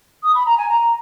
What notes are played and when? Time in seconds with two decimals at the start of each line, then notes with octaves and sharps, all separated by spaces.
0.23 D#6
0.35 B5
0.46 A#5
0.58 G#5
0.68 A#5